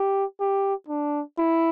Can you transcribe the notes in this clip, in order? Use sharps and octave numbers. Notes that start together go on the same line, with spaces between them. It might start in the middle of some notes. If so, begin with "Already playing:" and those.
Already playing: G4
G4
D4
E4